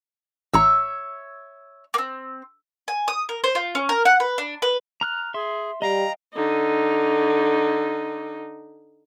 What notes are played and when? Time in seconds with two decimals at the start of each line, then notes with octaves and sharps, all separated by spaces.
0.54 A1 C#5 E5 A#5 E6
1.94 A#3 C4
2.88 G#5
3.08 D#6
3.29 A#4
3.44 C5
3.55 F4
3.75 C#4
3.89 A#4
4.05 F#5
4.20 B4
4.38 D4
4.62 B4
5.01 A#5 F6 F#6
5.34 G#4 E5 C6
5.82 G3 D#5 F5 G5 A#5
6.34 D3 D#4